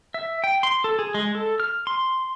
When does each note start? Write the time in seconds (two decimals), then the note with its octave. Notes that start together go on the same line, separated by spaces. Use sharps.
0.14 E5
0.44 G5
0.63 C6
0.84 A4
0.99 G#4
1.14 G#3
1.35 A4
1.60 F6
1.87 C6